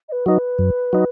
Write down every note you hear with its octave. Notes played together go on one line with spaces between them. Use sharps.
D#5
B4
F#3 D#4 G#4 B4
F#2
F#3 D#4